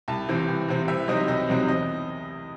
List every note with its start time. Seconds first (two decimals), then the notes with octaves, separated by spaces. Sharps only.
0.08 C2 A5
0.28 C3 E3 C4
0.49 C2
0.68 C3 E3 C4
0.88 C2 E5
1.07 C3 F#3 C4 D#4 D#5
1.28 C2 D#5
1.49 C3 F#3 C4 D#4
1.68 E2 D#5